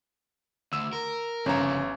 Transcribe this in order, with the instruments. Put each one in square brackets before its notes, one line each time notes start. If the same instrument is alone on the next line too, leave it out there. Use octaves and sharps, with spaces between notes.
[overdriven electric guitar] D2 [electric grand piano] E6
[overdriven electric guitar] A#4
[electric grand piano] G1 C#5 A#5 [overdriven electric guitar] F2 C#3 [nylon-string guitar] C#4